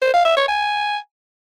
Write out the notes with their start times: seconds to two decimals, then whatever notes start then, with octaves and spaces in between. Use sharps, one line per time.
0.02 C5
0.13 F5
0.25 E5
0.37 C#5
0.48 G#5